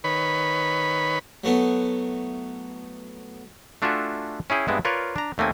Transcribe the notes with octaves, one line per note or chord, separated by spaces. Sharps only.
D#3 B4 C#5 B5
F#3 A3 B3 E4
A3 D4 F4 F#4 E5 G#5
C#4 E4 G#4 G5
G2 G#3 B3 C4 E4
F4 A#4 B4 C#5 D5
D4 A#5
D#2 A3 A#3 C4 G#5